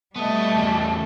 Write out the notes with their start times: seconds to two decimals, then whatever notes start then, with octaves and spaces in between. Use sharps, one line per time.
0.16 G3 A3 B3 D#5
0.57 E2 C#3